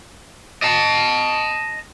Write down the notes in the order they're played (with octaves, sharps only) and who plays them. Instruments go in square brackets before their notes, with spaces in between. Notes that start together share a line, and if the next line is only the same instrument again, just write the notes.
[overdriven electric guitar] D#5 A5